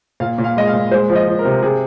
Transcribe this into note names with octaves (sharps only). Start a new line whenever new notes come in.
A#2 F5
A#2
F5
G#3 D#5
F5
A#2
G#3 C5
F3
D#5
F3
A#4
C3
C3 G#4